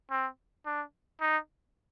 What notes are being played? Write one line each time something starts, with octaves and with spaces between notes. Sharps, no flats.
C4
D4
D#4